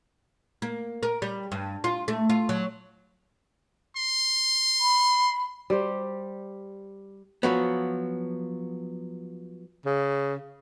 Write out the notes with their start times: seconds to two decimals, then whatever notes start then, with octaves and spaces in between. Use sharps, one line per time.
0.62 A#3
1.03 A#4
1.22 G3
1.52 G2
1.84 F4
2.08 A3
2.30 F4
2.49 F#3
3.97 C6
4.81 B5
5.70 G3 G4 C5
7.43 F3 F#3 B3
9.86 C#3